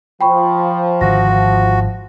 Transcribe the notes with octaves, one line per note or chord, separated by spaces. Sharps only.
F3 G5 B5 C#6
G#1 D3 F#4 A#6